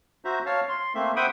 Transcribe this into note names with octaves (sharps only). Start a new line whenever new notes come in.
F#4 C5 E5 A#5
C#5 F5 A5
C6
A3 A#3 C4 E5
C5 E5 F#5 G5 B5 D#6